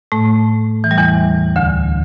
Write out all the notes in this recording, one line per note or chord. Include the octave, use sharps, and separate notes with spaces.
A2 A3
E3
G3
E2 E3
D2 D3